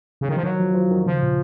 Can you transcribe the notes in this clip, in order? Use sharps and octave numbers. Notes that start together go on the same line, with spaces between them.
C#3
D#3
F3
D#3 F#3
F3
F3
D#3
C#3 F3
A#2